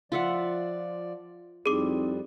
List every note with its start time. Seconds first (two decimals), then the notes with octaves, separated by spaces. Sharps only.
0.12 F3 F4 D5 E5 F#5
1.66 F2 G3 C4 D#4 E4 G#4 D6